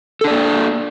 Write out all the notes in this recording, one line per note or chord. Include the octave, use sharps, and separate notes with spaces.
A#3 D4 A4 D5